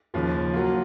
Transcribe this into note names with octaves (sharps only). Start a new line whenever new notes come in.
D#2 C#3 F3
F#3 A#3 F4